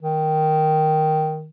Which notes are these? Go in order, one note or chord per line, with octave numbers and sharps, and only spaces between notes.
D#3